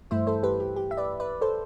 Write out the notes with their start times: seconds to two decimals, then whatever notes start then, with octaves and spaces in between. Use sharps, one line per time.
0.11 G2 E3 A3 E4 C5 E5
0.27 A4 C5
0.43 G4 B4
0.60 G4
0.76 G4
0.91 E5
0.97 B4 D5
1.20 B4 D5
1.41 A4 C5